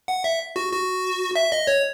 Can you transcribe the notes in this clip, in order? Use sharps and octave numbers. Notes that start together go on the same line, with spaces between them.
F#5
E5
F#4
F#4
E5
D#5
C#5